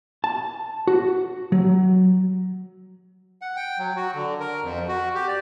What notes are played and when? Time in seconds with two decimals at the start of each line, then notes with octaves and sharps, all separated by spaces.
0.24 A5
0.87 F#4
1.52 F#3
3.42 F#5
3.56 G5
3.78 F#3
3.96 F#4
4.14 D3
4.40 A#4
4.63 F2
4.88 F#4
5.15 G4
5.28 D5